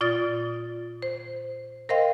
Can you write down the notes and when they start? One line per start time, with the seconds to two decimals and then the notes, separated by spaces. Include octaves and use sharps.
0.01 A#2 F4 D5 D#6 A6
1.02 C5
1.89 A#4 C5 D#5 F5 G5 C6